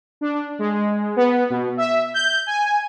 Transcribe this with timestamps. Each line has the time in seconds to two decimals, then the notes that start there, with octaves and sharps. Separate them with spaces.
0.21 D4
0.59 G#3
1.16 B3
1.50 B2
1.77 E5
2.14 G6
2.47 G#5